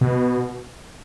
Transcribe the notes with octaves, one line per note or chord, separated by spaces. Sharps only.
B2